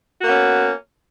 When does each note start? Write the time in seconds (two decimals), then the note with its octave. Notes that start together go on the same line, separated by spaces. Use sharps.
0.21 F#4
0.24 A#3
0.27 B3
0.30 C#4